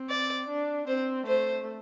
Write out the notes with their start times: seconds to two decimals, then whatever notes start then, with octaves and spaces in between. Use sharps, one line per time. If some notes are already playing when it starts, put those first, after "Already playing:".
Already playing: C4
0.10 D5
0.48 D4
0.87 C4 C5
1.26 A3 C5